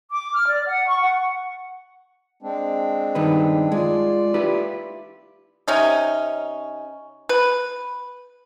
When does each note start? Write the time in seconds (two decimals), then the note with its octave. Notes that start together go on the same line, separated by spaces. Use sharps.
0.12 D6
0.33 F6
0.47 D5
0.67 F#5
0.88 C#6
1.01 F#5
2.42 G#3 C4 D4
3.15 G2 D#3 B4
3.72 G#3 F4 D5
4.34 E4 G4 B4
5.68 C3 C#4 D#4
7.29 B4